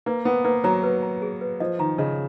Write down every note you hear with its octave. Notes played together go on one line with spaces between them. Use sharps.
A#3 B4
B3 B4
A#3 B4
F#3 A#5
B4
A#5
G#4
B4
F3 D#5
D#3 A#5
C#3 D#5